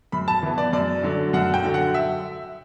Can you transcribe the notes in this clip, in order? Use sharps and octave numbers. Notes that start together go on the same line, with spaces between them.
F#2 B5
A5
E3 B3
D5
F#2 D5
D3 F#3
F#2 F#5
G5
D3 F#3
F#5
E5